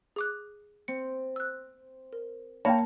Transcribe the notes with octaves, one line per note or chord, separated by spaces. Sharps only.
G#4 D6 F#6
C4 C#7
E6 F#6
A#4
A#3 C#5 F5 G5 A5 B5 A#6